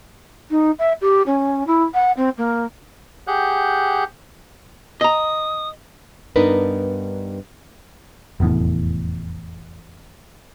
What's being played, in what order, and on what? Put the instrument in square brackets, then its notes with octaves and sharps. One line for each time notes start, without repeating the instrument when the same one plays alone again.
[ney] D#4
E5
G4
C#4
E4
F#5
C4
A#3
[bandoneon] G4 G#4 F#5 F#6 G6
[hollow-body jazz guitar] D#5 A#5 [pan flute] D#6
[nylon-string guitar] G2 B3 D4 D#4 A#4 B4
[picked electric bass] F1 E2 A2